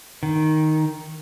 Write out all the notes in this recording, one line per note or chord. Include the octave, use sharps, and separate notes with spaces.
D#3